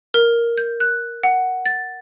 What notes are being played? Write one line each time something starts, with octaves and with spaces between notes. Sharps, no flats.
A#4
G6
F#6
F#5
A6